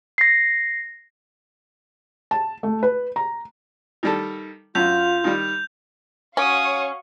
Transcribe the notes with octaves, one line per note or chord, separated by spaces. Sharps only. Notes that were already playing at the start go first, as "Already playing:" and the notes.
A#6 C7
A5
A3
B4
A#5
D#3 G3 A4
F#2 F4 G6 F7
D#3 G3
C#4 F#4 C#5 F5 C#6 D#6